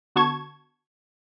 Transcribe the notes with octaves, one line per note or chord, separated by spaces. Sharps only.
D3 B3 F#4 A5 C#6 G#6